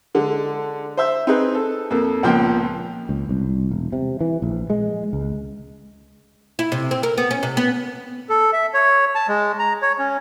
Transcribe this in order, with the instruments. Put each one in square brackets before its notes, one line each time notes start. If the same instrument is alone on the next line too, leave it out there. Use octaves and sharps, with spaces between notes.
[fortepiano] D3 G#3
C5 E5
C4 D#4 G#4 B4
A4
F2 A#3 A4
C#2 A#2 F3 B3 G5 C6
[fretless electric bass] C#2
C2
E1
C3
E3
A#1
G#3
C#2
[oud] E4
C3
C4
A#4
B3
C#4
C3
B3
[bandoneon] A4
E5
C#5
A5
G#3
A#5
C#5
C#4